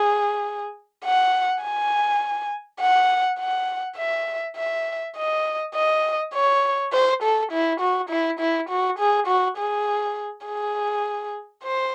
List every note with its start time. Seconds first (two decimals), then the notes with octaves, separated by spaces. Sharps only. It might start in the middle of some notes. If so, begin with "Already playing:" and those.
Already playing: G#4
1.05 F#5
1.62 G#5
2.81 F#5
3.39 F#5
3.98 E5
4.57 E5
5.17 D#5
5.75 D#5
6.33 C#5
6.93 C5
7.23 A4
7.52 E4
7.80 F#4
8.10 E4
8.40 E4
8.69 F#4
8.99 G#4
9.28 F#4
9.58 G#4
10.46 G#4
11.64 C5